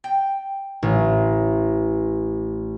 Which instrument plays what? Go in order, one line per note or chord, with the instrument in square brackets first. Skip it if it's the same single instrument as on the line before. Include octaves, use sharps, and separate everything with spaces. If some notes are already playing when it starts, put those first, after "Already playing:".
[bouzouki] G5
[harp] A1